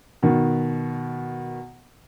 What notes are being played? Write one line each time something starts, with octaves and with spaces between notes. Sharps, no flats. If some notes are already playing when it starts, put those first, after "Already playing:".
B2 D#3